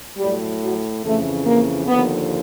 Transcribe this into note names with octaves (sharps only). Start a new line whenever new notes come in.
A2 F#3 G3
F#3
F2 C#3 E3 A3
A#3
D#2 D3 F3 B3